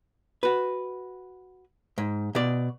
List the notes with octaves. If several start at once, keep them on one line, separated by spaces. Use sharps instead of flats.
F#4 B4
G#2
B2 D5